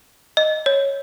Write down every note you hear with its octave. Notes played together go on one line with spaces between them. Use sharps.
D#5
C#5